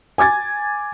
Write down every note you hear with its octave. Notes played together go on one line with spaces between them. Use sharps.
G#5 D6 G#6 A6